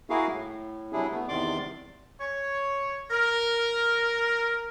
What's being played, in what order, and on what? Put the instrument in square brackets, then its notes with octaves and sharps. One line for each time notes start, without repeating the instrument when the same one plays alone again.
[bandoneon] A#3 E4 F#4 G#4 A#4 F5
A2
C3 F#3 G3 D4 E4 G#4
A3 B3
E2 C3 D#3 D5 C6 D6
[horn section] C#5
A#4